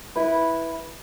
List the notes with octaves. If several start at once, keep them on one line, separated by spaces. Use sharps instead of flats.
E4 B4